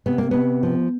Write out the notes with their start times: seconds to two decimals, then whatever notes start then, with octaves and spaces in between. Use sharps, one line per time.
0.06 C3 B3
0.18 A#3
0.31 C3 B3
0.63 F3